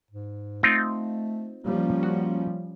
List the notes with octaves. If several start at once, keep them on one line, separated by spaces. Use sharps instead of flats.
G#2
A3 C4 D#4 F4
F3 G3 A#3 C#4
F#4